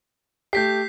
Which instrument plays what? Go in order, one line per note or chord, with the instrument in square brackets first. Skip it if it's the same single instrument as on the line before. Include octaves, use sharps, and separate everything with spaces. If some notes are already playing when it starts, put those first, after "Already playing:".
[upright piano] A3 G4 [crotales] G6 B6 C7